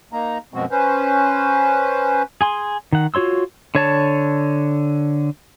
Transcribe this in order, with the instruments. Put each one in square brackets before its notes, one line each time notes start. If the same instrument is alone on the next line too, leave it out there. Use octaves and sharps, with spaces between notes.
[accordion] A#3 D#4 A#5
F#2 B2 F3 G#3 C4 F#4
C#4 B4 C5
[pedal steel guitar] G#4 G#5 C6
D#3 F#5
F4 F#4 C#5 C6 E6
D3 C#5 A5